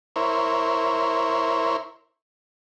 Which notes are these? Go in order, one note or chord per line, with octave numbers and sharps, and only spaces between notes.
E4 A#4 C5 C#5